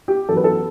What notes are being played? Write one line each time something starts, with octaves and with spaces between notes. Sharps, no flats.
G4
F#2 E3 B3 A4
B4
A4